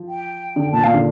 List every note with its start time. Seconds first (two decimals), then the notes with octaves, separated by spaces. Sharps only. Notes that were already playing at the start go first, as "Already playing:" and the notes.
Already playing: F3
0.08 G5
0.56 D3
0.72 A#2 A5
0.84 A#2 F5
0.94 D3